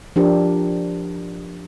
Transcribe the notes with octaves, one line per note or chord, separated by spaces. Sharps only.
F3 D4 G4 A#4